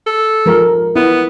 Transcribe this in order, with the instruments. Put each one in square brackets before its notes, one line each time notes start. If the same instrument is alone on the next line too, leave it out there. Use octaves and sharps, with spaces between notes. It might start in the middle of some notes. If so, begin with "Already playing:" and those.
[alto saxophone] A4
[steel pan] F3 G#3 A#4
[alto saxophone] B3 [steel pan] E4